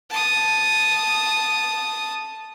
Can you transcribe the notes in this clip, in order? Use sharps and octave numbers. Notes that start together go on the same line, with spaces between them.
A5 D#6